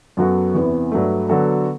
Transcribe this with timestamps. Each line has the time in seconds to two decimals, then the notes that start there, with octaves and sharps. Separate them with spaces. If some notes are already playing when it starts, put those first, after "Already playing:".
0.17 F#2 F#3 B3 F#4 A4
0.54 E2 C3 E3 B3
0.91 G2 F#3 A3
1.29 D3 F#3 B3 F#4 A4